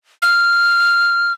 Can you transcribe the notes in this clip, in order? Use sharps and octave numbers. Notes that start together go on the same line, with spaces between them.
F6